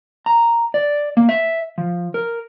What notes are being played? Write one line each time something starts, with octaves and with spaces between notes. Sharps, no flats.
A#5
D5
A#3
E5
F3
A#4